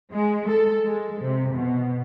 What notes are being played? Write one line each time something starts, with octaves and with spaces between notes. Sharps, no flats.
G#3
A4
G#3
C3
B2